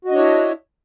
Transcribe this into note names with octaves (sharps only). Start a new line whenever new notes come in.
D4 E4 F#4 C#5 D#5